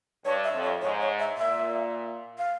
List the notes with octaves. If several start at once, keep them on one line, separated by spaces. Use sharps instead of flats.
G2 C#5
E5
F2
C#5
G#2 C#5
C#5
E5
A#2 E5
F5